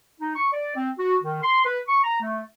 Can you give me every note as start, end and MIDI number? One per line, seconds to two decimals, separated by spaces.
0.21 0.33 63
0.36 0.49 85
0.53 0.74 74
0.76 0.91 60
0.99 1.16 66
1.23 1.42 51
1.43 1.64 84
1.65 1.79 71
1.88 2.00 85
2.04 2.18 82
2.22 2.44 57